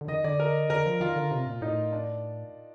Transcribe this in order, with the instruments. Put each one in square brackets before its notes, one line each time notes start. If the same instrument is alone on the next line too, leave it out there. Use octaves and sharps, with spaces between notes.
[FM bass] D3
[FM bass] D#3 [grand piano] D#5
[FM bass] D3 [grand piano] D5
[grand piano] A#4
[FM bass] D3 [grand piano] A#4
[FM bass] F3
[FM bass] D#3 [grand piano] F4
[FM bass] D3
C3
A#2
[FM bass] A2 [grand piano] D#4
[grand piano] D4